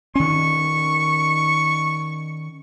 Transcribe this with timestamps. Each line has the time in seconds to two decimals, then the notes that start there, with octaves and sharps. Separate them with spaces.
0.15 D#3 C#4 C#6